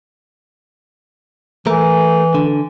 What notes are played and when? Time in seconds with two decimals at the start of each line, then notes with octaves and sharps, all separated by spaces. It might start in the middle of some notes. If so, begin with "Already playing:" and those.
1.67 E3 A3 A#4
2.35 D3